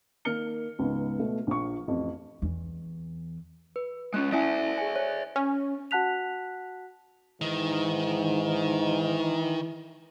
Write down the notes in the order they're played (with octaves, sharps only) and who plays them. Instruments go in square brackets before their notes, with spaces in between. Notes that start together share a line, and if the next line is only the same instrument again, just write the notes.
[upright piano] D#3 A#3 F6 C#7 G7
C#2 G#2 B3
B2 A3
A#1 F3 C#6
A1 F2
[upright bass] E2
[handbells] B4
[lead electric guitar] G#3 C#4 [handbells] F#6
[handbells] C#4 E4 G#5 [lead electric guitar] D5 E5
[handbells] G#4 G#5
C#5 G#5
[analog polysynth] C#4
[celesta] F#4 F#5 A5 F#6 B6 F7
[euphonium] G#2 [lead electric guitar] D#3 [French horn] E3